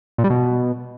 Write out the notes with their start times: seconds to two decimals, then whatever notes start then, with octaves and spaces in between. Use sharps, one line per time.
0.18 A#2
0.24 G3
0.30 B2